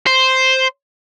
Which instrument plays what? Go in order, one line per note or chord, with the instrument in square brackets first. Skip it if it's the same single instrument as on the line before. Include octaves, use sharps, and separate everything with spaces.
[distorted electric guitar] C5